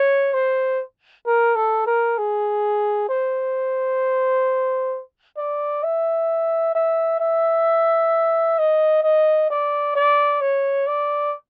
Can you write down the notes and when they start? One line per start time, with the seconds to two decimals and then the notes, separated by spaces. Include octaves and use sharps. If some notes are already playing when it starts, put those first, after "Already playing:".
Already playing: C#5
0.34 C5
1.26 A#4
1.56 A4
1.87 A#4
2.18 G#4
3.09 C5
5.38 D5
5.84 E5
6.75 E5
7.20 E5
8.59 D#5
9.03 D#5
9.50 D5
9.96 D5
10.41 C#5
10.87 D5